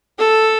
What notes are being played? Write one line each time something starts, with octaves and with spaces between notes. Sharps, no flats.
A4